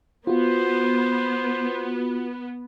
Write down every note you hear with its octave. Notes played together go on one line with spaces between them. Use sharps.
B3 F4 F#4 C5